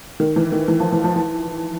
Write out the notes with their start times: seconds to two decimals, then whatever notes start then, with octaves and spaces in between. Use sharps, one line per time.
0.20 D#3
0.36 E3
0.52 D#3
0.68 E3
0.80 F3
0.92 E3
1.04 F3
1.16 E3